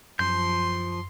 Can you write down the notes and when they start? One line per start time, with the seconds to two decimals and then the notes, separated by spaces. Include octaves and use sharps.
0.19 F#2 F3 C6 G6